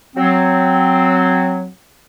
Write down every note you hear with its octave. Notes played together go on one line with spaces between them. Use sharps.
F#3 C4